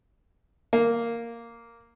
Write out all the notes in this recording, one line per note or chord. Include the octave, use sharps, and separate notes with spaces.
A#3